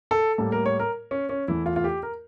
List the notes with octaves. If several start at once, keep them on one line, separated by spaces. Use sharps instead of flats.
A4
A2 G3 A#3 A4
A#4
C#5
A#4
C#4
C#4
E2 E3 A3 E4
F4
F4
G4
A#4